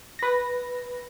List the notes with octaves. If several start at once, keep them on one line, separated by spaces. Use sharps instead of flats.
B4 A#6